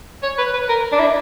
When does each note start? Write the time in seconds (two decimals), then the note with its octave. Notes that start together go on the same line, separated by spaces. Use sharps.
0.23 C#5
0.38 B4
0.53 B4
0.69 A#4
0.92 D4
0.99 E4